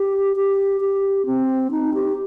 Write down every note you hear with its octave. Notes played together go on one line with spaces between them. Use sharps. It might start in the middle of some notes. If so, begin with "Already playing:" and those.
Already playing: G4
G4
G4
C4
D#4
G4